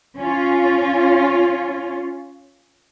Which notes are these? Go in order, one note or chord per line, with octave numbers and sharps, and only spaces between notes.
C#4 F4